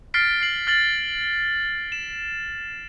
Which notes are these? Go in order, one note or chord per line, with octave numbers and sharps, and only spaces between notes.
F6 A6 B6 C7 D7
C7 F#7
F6 A6 F#7
E7